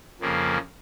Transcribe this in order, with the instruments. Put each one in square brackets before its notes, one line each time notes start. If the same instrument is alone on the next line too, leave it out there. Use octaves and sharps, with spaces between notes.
[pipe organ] F2 C#3 F3 A#3